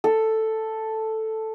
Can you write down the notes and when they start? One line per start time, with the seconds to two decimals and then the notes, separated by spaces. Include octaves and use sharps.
0.04 A4